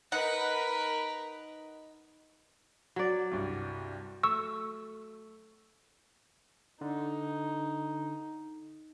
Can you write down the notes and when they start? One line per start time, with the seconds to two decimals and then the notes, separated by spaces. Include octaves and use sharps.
0.12 D#4 A#4 B4 F#5
2.96 F#3 D5
3.31 C2 G2
4.23 A3 C#6 E6
6.81 D3 D#4